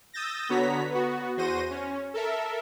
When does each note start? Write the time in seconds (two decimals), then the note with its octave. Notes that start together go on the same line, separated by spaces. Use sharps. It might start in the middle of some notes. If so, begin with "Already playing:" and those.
0.13 D#6 E6 G6 A6 A#6
0.49 D3 B3 F#4 C#5 A#5 B6
0.90 B3 F#4
1.37 E2 F#4 C5 A#6 D#7
1.70 C#4
2.14 A4 A#4 E5